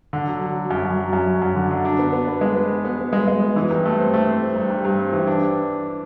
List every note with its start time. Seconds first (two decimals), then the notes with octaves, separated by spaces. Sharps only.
0.13 D3
0.27 F#3
0.41 F#3
0.56 F#3
0.71 F#2
0.84 F#2
0.99 F#3
1.13 F#2
1.27 F#3
1.42 F#2
1.56 D3
1.71 D3
1.85 D4
1.99 B3
2.13 B3
2.28 B3
2.41 G#3
2.56 B3
2.70 B3
2.85 B3
2.99 B3
3.13 G#3
3.28 G#3
3.41 B3
3.56 E3
3.70 G2
3.85 A3
3.99 C4
4.14 A3
4.28 C4
4.42 C4
4.56 G2
4.70 G2
4.85 G2
4.99 C4
5.13 E3
5.27 D4
5.42 D4